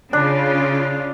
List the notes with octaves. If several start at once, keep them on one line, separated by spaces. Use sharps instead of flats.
C#3 D4 F4